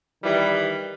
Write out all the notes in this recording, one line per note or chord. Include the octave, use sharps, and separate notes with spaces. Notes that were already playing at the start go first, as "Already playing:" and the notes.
D#3 E3 G3